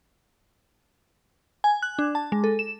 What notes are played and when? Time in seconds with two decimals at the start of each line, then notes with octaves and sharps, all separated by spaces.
1.64 G#5
1.82 F#6
1.99 D4
2.15 A5
2.32 G#3
2.44 A4
2.59 E7